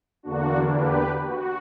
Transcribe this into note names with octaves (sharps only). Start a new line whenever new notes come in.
E2 D3 A#3 D4 F#4
G4 B4
F#4